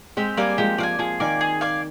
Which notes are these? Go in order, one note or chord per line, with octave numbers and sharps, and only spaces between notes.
G#3 C4 G4
G3 A#3 D5 F5 G#5
F3 G#3 G4
F3 D5 F5 G#5
F3 G#4
D#3 D5 F5 G#5
G#4
D5 F5 G#5